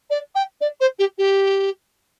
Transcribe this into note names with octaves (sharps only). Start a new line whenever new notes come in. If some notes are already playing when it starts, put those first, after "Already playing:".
D5
G5
D5
C5
G4
G4